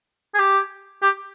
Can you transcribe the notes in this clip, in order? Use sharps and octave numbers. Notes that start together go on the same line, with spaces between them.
G#4
G4
G4